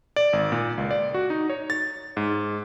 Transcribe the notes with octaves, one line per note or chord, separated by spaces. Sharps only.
D5
G#1
A#2
C#2
D5
F#4
D#4
C#5
A6
G#2